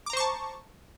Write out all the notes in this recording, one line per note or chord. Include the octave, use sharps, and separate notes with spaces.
C5 A5 A#5 C#6 D6